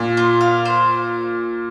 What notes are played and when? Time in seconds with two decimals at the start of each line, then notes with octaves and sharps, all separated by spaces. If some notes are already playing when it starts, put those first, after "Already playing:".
Already playing: A#2
0.17 F4
0.41 F5
0.65 C5